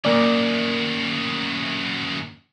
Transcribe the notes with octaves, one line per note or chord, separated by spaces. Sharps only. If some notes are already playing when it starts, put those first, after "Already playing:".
F#2 D#3 A#3 D5